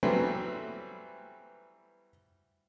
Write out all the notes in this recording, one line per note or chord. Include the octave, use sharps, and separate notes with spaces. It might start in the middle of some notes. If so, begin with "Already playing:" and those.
E3 F#3 G3 A3 B3 C4